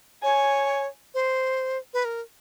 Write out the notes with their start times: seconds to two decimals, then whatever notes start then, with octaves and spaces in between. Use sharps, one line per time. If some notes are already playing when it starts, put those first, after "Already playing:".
0.23 C#5 G#5
1.14 C5
1.94 B4
2.05 A#4